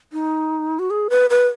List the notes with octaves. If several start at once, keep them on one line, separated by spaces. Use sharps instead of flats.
D#4
F#4
G#4
B4
B4